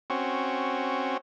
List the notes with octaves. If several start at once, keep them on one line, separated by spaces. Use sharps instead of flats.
C4 C#4 F#4